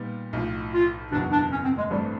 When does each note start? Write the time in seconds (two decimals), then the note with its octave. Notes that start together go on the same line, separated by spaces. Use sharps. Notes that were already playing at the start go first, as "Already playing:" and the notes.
Already playing: A#2 G3 B3 D#4
0.33 B1 A2 F3
0.73 F4
1.12 F#1 E2 B2 F#3 D4
1.32 D4
1.51 C#4
1.64 C4
1.78 G#3
1.91 A1 G2 E3 G3 A3 C4